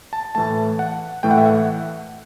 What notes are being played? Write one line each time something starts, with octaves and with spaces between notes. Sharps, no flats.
A5
A2 E3 A3 A5
F#5
A2 E3 A3 G5
F#5
E5
F#5